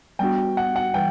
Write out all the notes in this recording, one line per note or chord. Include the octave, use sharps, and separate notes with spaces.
G3 B3 D4 F#4 G5
F#5
F#5
E3 G3 G5